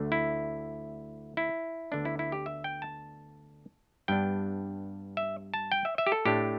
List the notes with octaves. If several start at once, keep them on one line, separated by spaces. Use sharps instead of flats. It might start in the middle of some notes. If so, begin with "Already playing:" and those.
Already playing: D2 D3 A3
E4
E4
D2 D3 B3 D4
E4
E4
G4
E5
G5
A5
G2 G3 B3 D4 G5
E5
A5
G5
E5
E5
G4
A4
A2 A3 D4 G4